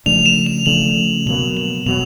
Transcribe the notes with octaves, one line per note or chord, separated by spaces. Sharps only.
C#3 F3 A3 D4 F7
E7
F7
C#3 F3 A3 D4 F#7
B2 F#3 A#3 F#7
F#7
B2 F#3 F7